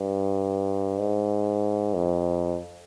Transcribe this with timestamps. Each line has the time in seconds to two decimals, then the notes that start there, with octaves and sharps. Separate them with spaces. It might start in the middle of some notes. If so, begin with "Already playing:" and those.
Already playing: G2
0.99 G#2
1.94 F2